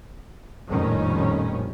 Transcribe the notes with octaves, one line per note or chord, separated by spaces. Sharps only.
A#1 F2 A2 D#3 G3 C#4